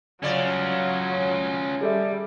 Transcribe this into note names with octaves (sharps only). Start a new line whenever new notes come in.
C#3 F#3 C#4 F4 D5
G3 G#4 A4 E5